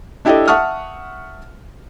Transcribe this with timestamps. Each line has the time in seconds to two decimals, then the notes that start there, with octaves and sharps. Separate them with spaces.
0.25 D4 E4 G4 A4 D5 D#5
0.48 E5 F#5 A5 C#6 D#6 F6